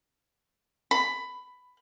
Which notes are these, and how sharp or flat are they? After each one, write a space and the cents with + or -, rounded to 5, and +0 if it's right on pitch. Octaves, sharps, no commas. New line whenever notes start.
B5 +15